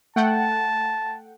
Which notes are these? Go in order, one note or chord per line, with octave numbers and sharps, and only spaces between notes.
A3 F#5 G5 A5